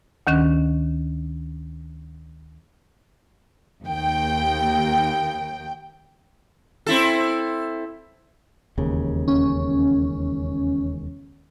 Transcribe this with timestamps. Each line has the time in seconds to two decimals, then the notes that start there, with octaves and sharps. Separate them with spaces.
0.27 D2 D#3 C#4 F#6
3.86 D#2 G5
6.87 C4 E4 A4
8.78 E1 D#2 C#3
9.28 C#4